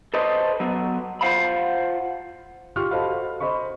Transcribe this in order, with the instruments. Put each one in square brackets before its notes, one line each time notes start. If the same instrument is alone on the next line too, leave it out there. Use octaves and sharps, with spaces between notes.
[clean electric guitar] A4 B4 C5 D#5
F#3 B3
F4 C5 F5 F#5 B5
[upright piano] F4 G4 C6 C#6 F6
F#4 A4 C5 D#5 F5 B5
C5 D#5 B5 C#6